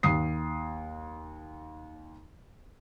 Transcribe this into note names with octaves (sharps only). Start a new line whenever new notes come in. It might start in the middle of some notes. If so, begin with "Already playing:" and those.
D#2 D#6 C7